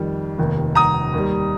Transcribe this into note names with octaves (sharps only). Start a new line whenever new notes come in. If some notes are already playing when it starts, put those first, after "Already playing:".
Already playing: F2 D#3 G3
F1 D#2 D#3
A#5 D#6
D#2 D#3 G3